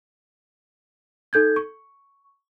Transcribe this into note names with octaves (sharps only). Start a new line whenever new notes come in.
D#4 A4 G6 G#6
C#6